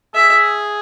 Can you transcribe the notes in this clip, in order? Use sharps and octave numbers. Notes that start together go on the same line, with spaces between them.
G#4 E5